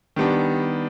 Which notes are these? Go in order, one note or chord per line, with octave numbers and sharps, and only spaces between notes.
D#3 G3 B3 D4